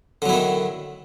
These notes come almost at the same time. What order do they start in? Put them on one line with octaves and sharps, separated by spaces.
D3 F#3 E4 D#3